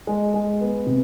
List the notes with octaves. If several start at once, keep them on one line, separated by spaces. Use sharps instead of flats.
G#3
G#3
B3
C3